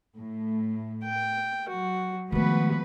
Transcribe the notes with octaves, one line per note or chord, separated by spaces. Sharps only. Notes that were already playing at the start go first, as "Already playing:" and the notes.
A2 A3
G5
F#3 F#4
D#3 F3 G#3 A3 B3 F#4 B4